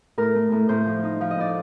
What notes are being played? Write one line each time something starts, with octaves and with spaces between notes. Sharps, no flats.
A2 A#4
A3
A2
A2 C5
F3
D#4
F3 F5
D#5
A2 D5